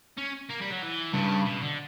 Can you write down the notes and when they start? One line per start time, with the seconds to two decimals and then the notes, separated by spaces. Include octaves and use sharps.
0.17 C#4
0.49 A#3
0.61 G3
0.71 F#3
0.82 E3
1.13 G2 C#3
1.46 B2
1.61 D3